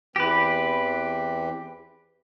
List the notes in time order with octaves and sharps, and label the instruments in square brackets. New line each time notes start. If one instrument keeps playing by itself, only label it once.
[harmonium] E2 E3 C4 [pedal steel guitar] G4 B4